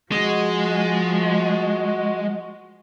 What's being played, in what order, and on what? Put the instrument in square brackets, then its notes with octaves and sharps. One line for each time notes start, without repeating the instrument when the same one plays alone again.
[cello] F3 [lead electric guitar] G#3 [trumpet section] F#4